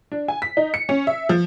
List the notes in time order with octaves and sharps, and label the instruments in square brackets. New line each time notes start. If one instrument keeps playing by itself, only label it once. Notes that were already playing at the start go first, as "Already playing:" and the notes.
[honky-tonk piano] D4
G#5
B6
D#4
C#7
C#4
E5
F3